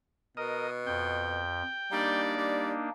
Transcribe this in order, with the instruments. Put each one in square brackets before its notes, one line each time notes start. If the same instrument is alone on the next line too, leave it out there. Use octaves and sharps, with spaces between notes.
[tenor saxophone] B2 [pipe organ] A#4 [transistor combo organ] D#5
[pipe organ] F2 [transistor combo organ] G5
[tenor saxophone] G3 [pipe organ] A#3 D4 D#4 [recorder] D5
[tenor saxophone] G3